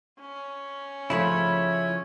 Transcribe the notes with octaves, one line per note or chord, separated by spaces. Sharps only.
C#4
C#3 F3 A3 E4 C#5 B5